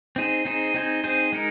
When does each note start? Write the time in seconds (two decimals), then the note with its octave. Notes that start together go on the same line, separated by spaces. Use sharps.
0.16 C4 D#4 G#4 C5
0.45 C4 D#4 G#4 C5
0.74 C4 D#4 G#4 C5
1.04 C4 D#4 G#4 C5
1.32 G#3 D#4 A#4